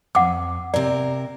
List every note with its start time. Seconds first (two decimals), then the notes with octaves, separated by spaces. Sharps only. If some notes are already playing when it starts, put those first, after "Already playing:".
0.15 F2 F#5 D6
0.74 C3 A#4 D5